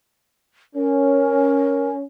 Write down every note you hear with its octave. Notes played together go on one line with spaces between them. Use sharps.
C#4 A#4